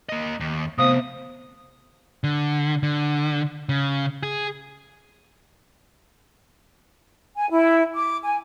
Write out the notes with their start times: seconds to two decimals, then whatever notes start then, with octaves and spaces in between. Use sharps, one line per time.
0.09 A#3 D#5
0.40 D#2
0.78 C3 A3 B3 C5 F5 D#6
2.24 D3
2.83 D3
3.69 C#3
4.23 G#4
7.35 G#5
7.50 E4
7.94 D6
8.25 G#5